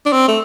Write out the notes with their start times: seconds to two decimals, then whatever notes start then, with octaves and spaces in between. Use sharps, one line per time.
0.06 D4
0.13 C4
0.28 A3